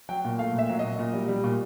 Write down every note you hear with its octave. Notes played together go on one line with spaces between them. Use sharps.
F#3 G5
A#2
A3 F5
A#2
E5
F#3
A#2 D#5
A#2
G3
G3
A#2